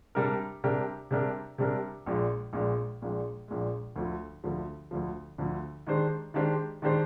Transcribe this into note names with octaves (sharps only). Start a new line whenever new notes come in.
C3 G3 D4 G4 A#4
C3 G3 D4 G4 A#4
C3 G3 D4 G4 A#4
C3 G3 D4 G4 A#4
A#1 A#2 G#3
A#1 A#2 G#3
A#1 A#2 G#3
A#1 A#2 G#3
D2 D3 F3
D2 D3 F3
D2 D3 F3
D2 D3 F3
D#3 G#3 D4 G4 C5
D#3 G#3 D4 G4 C5
D#3 G#3 D4 G4 C5